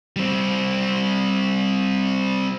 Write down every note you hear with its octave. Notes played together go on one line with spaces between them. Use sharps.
G3 C4